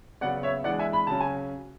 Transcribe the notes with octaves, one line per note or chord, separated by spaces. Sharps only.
C#3 F#3 B3 D5 F#5
C#5 E5
E3 G#3 D4 D5 F#5
E5 G#5
B5
C#3 F#3 C#4 A5
G#5